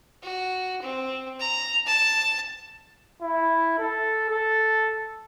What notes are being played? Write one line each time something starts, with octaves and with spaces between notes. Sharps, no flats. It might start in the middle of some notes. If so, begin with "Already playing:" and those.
F#4
C4
A#5
A5
E4
A4
A4